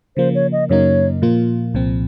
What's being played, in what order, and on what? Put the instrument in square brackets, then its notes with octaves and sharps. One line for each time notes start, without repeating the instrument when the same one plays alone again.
[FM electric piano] C#3 F3 A#3 [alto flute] C5
[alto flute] C#5
D#5
[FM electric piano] F#2 C#3 F#3 A#3 D#4 [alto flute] C#5
[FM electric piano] A#2 F3 A#3 F4
C2 A#2 F3 C4